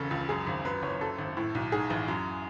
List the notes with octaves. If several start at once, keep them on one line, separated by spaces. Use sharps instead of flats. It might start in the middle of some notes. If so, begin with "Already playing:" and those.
Already playing: E1 C#3 A4
C#2
F#2 G#4
G#1
F#2 B4
F#1 C#5
F#2 A4
G#1
A2
B1
G#2 G#4
A1
F#2